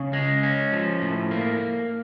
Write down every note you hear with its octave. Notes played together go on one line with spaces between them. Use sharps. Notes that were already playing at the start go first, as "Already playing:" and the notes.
Already playing: C#3
G#3
C#4
F3
A2
A#3